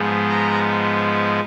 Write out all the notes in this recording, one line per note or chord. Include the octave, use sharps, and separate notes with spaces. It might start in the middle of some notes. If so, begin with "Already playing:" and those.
Already playing: G#2 F3 G#3 B3
A#5